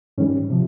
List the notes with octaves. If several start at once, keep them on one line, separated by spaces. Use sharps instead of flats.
G#2 D#3 G3 C#4
C3 F3